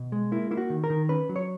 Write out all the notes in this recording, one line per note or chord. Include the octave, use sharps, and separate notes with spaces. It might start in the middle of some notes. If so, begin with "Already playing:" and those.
Already playing: B2
G#3
A#3 E4
A#3 E4
F#4
D#3
A#4
D#3
C#4 B4
F#3
C#5